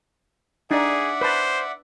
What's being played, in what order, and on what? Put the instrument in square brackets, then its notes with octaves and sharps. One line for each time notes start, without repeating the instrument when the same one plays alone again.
[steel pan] D4 D#4 [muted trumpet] G#4 [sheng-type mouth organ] D5 E5 F#5
[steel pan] B4 A5 [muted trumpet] C5